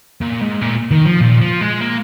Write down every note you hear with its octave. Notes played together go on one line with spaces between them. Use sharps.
A#2
G#2
A#2
D#3
F3
A#2
F3
G#3
A#3